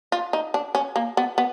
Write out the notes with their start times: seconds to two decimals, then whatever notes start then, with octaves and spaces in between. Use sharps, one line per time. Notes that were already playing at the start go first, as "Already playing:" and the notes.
0.12 F4
0.33 D#4
0.54 D4
0.75 C#4
0.96 A#3
1.17 B3
1.38 B3